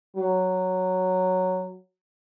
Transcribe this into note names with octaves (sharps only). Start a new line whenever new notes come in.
F#3